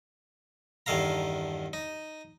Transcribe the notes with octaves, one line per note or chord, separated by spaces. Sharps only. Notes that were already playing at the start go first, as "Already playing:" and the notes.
E2 G2 D#3 A4 F5 A#5
D#4